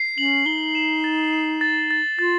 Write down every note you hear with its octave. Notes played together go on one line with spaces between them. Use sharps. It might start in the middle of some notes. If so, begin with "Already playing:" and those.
Already playing: C7
C#4 F#7
D#4 G7
E7
A6
E7
A6
A6
F4 A6